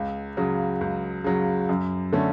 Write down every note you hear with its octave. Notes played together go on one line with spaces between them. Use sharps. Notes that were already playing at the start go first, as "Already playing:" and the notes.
Already playing: C#2
C#3 F#3
C#2
C#3 F#3
F#2
D3 A3 C#4